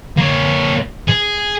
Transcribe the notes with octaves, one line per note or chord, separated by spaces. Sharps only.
A#3 C#5
G#4